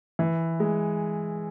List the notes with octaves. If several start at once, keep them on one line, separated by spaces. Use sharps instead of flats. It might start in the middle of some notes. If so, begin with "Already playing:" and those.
E3
G#3